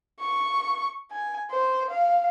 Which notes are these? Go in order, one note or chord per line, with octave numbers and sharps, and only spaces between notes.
C#6
G#5
C5
F5